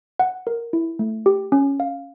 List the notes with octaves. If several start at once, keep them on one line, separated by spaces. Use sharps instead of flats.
F#5
A#4
E4
A3
G4
C#4
F5